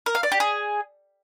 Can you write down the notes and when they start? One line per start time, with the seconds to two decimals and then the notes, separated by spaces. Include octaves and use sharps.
0.06 A#4
0.15 F5
0.23 D5
0.32 G4
0.40 G#4